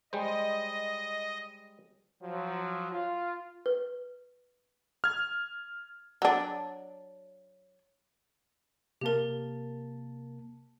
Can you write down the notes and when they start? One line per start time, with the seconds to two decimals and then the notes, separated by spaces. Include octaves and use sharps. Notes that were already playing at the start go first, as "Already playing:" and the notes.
0.13 G3 G#3 C5 D#5
2.22 F3 F#3
2.91 F4
3.66 B4
5.04 F6 G#6
6.22 F#3 D4
9.01 C3 A#3 G4 A#4 A5